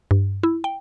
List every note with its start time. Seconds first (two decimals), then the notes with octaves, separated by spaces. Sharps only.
0.11 G2
0.43 E4
0.64 G5